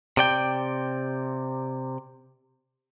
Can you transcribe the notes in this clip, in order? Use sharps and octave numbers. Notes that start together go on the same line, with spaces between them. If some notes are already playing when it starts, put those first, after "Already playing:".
C3 D5 G5